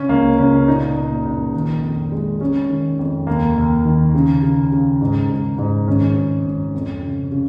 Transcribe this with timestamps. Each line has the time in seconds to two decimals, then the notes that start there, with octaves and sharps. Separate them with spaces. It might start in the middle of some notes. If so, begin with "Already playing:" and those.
Already playing: C#3 C#4
0.09 C#2 A#3
0.39 C#2 C#4
0.68 A#2 D#4
0.96 A#2
1.25 A#1
1.54 D#3
1.82 F2
2.12 G#3
2.40 G#3 C#4
2.69 D#3
2.99 F2
3.27 D#2 A#3
3.56 D#2
3.85 D#3
4.14 C#3
4.43 C#3
4.72 C#3
5.01 G#2
5.29 G#2
5.58 G#2
5.87 G#1 C#4
6.17 G#2
6.45 G#1
6.74 F2
7.02 C#3
7.32 C#3